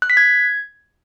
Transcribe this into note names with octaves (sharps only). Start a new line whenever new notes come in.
F#6
B6
G#6